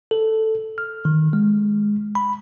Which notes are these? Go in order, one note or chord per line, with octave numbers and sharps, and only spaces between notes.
A4
F6
D#3
G#3
B5